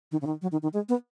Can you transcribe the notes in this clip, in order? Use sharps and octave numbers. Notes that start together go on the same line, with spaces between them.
D#3
C#3
D#3
F#3
D#3
D#3
G#3
B3